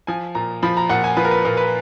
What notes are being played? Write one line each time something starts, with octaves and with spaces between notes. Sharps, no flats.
F3 G#5
A#2 A#5
F3 B5
A#5
A#2 F#5
G#5
F3 B4
A#4
B4
A#2 A#4
B4